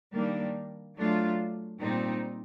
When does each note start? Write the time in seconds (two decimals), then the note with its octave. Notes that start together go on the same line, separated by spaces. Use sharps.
0.13 D#3 G3 A#3 D4
0.97 F#3 A3 D4 F4
1.81 A#2 G3 C4 D#4